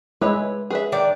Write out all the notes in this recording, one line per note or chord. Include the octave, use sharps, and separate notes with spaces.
G#3 E4 B4 C#5
G#4 B4 E5
D#3 D4 D5